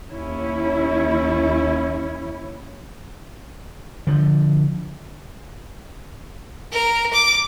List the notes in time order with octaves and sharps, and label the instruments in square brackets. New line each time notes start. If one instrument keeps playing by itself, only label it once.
[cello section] D#2 C#4 E4
[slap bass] D3 F3
[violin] A#4
D6